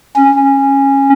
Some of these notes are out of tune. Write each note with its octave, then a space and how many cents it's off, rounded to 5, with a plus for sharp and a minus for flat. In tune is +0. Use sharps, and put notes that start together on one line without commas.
C#4 -15